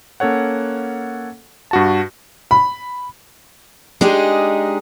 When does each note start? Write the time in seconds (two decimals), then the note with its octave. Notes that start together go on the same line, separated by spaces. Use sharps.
0.20 A#3 C#4 A4 C#5 F#5
1.71 G2 F#4 A5
2.51 B5
4.01 G#3 D4 D#4 G4 G#4